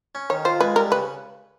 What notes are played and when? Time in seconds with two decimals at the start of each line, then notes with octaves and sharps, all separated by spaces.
0.15 C#4
0.30 D#3 C#5
0.45 F4 C5
0.61 G#3 B4
0.76 G3 A#4
0.91 C#3 B4